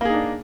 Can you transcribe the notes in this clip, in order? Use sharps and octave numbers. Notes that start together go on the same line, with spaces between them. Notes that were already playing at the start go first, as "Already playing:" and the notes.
A#3 D4 D#4 G#4